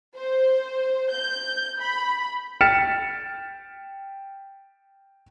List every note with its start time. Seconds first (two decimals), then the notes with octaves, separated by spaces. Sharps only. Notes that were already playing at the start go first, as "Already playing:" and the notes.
0.17 C5
1.12 G6
1.80 B5
2.61 G5 F6 A6 B6 C#7 E7